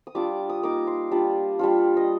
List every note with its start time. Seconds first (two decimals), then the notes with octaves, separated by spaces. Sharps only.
0.07 D#6
0.15 G3 D4 F4 D6
0.49 D#6
0.63 A#3 D#4 D6
0.87 C6
1.11 G3 D4 F4
1.59 G3 D4 F4
1.97 D#5